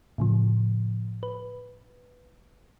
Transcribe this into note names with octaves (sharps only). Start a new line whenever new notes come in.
A2 C#3 F3
B4